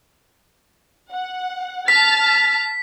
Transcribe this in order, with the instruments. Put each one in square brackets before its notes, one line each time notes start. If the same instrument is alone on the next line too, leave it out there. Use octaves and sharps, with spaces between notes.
[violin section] F#5
[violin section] A5 F6 A6 [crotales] B6